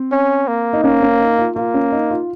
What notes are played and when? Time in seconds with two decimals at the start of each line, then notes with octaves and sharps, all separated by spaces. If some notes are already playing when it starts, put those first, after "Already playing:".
Already playing: C4
0.12 C#4
0.47 A#3
0.73 D#4
0.83 A#3 C#4
1.02 C#4
1.20 D#4
1.38 F4
1.56 A#3 F4
1.74 C#4
1.92 D#4
2.11 F4